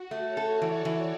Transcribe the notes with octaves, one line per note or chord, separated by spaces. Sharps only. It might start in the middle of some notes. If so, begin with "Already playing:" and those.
Already playing: F#4
A3
C#5
A4
E3 D5
E3